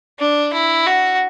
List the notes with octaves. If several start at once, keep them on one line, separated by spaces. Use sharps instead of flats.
D4
E4
F#4